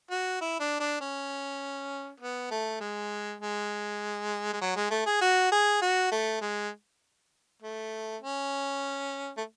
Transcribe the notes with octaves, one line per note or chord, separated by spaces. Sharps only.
F#4
E4
D4
D4
C#4
B3
A3
G#3
G#3
G#3
F#3
G#3
A3
G#4
F#4
G#4
F#4
A3
G#3
A3
C#4
A3